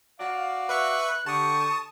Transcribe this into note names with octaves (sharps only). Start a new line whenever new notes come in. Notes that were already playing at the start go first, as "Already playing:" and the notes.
F#4 D5 F5
B4 E5 C#6 F#6
D3 G4 A5 C#6 D#6